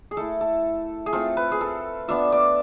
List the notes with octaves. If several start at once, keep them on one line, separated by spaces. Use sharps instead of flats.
G#4
A3 E4 A4
A4
G#4
A3 C4 F4 A4
B4
G#4
A4
B3 D4 F4 E5
D5